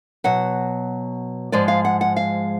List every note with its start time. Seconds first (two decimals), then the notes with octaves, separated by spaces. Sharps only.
0.24 B2 F#3 F#5
1.52 G#2 F3 G#3 D5
1.68 F5
1.85 F#5
2.01 F#5
2.16 F5